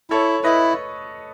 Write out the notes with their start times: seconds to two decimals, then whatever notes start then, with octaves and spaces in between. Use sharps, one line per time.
0.10 E4 A4 C#5
0.44 E4 B4 D#5